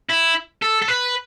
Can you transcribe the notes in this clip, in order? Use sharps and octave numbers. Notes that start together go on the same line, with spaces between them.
E4
A4
A4
B4